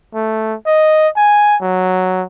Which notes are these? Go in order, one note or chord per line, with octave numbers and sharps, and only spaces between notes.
A3
D#5
G#5
F#3